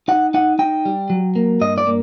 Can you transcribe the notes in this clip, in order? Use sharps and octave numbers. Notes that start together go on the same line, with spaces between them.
D#4 F#5
D#4 F#5
D#4 G5
G3
F#3
A#3
G2 D#5
D5
A#3